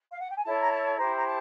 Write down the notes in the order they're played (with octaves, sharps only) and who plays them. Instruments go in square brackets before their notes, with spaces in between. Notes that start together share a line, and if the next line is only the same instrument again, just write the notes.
[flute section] F5
F#5
G5
G#5
E4 A4 C#5 A5
A#5
A5
E4 G4 C5 A#5
A#5
A5